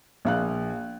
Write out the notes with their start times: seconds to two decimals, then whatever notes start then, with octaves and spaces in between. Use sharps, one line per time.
0.25 A#1 F5 F#6